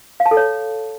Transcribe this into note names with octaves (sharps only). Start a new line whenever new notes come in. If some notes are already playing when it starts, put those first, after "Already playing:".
F5
A5
A4
C#5